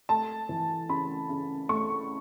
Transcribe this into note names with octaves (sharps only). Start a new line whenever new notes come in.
A3 A5
E3
C#3 B5
C#3
A3 C#6